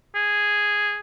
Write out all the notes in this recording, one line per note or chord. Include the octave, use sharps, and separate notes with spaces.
G#4